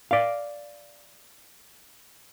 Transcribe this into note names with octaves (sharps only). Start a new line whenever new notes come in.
D5 F5